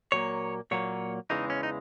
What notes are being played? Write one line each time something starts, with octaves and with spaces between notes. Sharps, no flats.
A#2 F#3 A#3 C#5
A#2 F#3 A#3 C#5
E2 C#3 E3 G#3 D#4
C#4
D#4